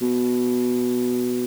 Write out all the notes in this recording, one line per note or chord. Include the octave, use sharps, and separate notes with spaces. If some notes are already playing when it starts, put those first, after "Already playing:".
B2